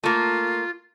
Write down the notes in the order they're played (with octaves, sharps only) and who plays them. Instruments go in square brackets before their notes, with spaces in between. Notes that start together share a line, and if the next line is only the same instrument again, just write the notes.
[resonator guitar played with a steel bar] A3 A#3 [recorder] F4